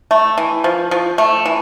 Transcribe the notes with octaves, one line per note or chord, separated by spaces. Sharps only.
A3
E3
F3
F3
A3
E3